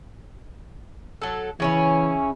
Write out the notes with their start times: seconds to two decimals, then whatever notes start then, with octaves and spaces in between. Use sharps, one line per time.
1.22 F#3 A4
1.60 C#3 E3 C#4 E4